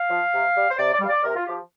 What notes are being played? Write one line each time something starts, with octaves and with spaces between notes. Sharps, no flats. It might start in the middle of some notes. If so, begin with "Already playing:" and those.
Already playing: F5
F3
C3
G3
C5
C3 D5
D5
G3 F5
D5
C3 A#4
F4
F3 G4